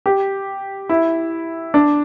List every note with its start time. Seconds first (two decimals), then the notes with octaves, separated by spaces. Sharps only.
0.06 G4
0.89 E4
1.74 D4